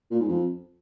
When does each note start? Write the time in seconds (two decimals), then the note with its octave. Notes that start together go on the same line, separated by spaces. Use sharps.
0.11 A#2
0.20 G#2
0.29 F2